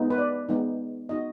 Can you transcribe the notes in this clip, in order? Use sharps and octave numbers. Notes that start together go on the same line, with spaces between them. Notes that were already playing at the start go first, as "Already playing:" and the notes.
Already playing: G#3 B3 D#4
B4
D5
G#3 B3 D#4
B3 D#4 F#4 D#5